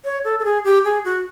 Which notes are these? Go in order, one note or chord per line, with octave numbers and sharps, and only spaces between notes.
C#5
A4
A4
G#4
G4
G#4
F#4